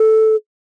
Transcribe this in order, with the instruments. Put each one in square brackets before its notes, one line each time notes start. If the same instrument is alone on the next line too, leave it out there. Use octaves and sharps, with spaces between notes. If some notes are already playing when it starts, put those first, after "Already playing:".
Already playing: [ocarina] A4